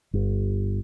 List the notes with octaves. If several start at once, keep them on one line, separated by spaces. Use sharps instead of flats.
G1